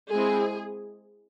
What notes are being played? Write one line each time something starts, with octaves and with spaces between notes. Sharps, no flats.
G#3 C4 E4 G#4